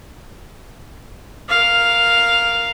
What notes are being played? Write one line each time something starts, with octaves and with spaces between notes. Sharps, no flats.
A#4 F5